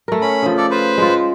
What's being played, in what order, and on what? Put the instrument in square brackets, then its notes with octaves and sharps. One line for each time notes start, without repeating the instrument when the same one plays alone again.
[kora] A3 A#4
[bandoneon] C#4 B5
[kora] C#3 F3
[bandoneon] A4 D5
B4 C5
[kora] G#3 F4